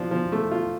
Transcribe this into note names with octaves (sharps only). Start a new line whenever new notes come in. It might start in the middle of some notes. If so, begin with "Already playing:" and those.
Already playing: F3 D4
F3
A3
F4